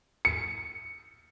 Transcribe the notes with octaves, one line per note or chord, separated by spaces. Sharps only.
C#7